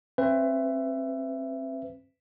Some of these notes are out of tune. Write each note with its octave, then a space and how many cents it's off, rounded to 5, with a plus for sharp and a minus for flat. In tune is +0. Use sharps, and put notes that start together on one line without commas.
C4 +30 B4 +30 E5 +20